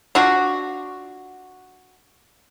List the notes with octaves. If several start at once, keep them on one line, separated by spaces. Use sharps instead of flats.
D4 F4 F#4